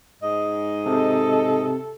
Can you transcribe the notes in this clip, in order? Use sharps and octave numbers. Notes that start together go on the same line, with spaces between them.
G#2 D#5
C3 A4